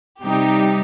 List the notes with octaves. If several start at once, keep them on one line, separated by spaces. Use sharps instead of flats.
C3 G3 D#4 G4